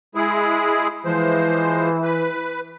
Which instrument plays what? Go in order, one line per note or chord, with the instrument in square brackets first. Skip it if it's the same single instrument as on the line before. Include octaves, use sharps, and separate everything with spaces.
[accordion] G#3 E4 G#4
[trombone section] E3 [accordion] F3 G#3 C5
[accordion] B4